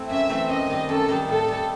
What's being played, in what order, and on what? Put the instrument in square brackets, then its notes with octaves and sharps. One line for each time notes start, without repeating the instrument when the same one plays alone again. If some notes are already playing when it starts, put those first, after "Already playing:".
Already playing: [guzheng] A3 C4 E4
[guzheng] F#2 [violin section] E5
[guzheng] E3 A3 C4 E4
[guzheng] F#2 [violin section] D#5
[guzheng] D#3 G3 D#4
[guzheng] F#2 [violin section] A4
[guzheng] D#3 G3 D#4
[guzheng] A2 [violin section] A4
[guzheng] G3 D#4